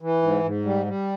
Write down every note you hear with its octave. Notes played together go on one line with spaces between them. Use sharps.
E3
G#2
G#2
G3
G3